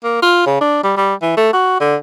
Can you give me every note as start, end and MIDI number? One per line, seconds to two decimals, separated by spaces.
0.04 0.19 58
0.22 0.45 65
0.46 0.60 49
0.61 0.80 62
0.84 0.94 55
0.97 1.14 55
1.22 1.33 52
1.37 1.51 57
1.53 1.76 66
1.80 1.96 50